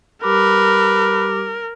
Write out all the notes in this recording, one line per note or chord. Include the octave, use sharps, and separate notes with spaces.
G3 G4 A#4 B4 D6